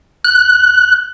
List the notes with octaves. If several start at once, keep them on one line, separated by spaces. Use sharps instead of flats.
F#6